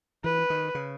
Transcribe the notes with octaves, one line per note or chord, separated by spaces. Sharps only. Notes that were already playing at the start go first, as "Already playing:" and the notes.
E3 B4
D#3
C#3